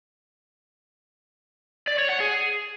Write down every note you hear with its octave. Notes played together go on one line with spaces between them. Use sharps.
D5
C#5
F#5
G#4